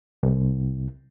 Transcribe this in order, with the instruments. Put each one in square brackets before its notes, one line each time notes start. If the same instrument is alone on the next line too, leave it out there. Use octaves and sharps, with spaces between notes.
[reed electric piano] C2